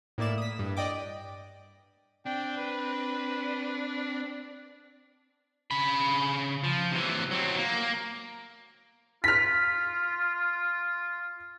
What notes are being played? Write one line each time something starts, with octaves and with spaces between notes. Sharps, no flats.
A2 A#3 E4 D5 E7
D#6 B6
G2
D5 D#5 G5 D6
C4 D4 G5
B4
C#3 B5
F3
C3 E3
F#3 C4
A#3
F4 F6 B6